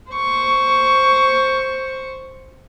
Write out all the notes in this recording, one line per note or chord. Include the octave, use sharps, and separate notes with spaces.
C5 C#6